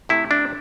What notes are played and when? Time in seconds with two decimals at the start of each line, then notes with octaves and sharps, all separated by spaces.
0.09 C3 A3 E4
0.31 D4